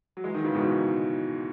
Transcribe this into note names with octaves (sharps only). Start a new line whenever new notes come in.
F#3
E3 G#3
D#3 F#3
C#3 E3
G#2 B2